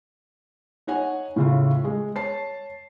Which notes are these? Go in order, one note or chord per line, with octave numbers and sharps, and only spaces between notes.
D#4 C#5 F#5 G#5
A2 C#3 F4
G#3
C#5 A5 C7